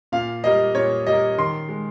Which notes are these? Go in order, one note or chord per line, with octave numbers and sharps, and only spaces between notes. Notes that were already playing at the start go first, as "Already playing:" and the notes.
A#2 F5
G3 A#3 D#5
A#2 C#5
G3 A#3 D#5
D#3 C6
G#3